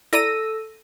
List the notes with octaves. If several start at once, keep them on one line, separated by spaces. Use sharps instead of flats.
E4 A4 D5 A#5 E6 A#6 D#7